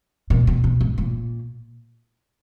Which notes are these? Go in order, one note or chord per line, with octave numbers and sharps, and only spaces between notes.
A#2
B2
B2
G#2
A#2